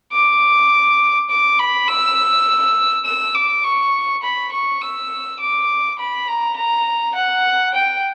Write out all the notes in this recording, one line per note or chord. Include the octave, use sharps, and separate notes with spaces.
D6
D6
B5
E6
E6
D6
C#6
B5
C#6
E6
D6
B5
A#5
A#5
F#5
G5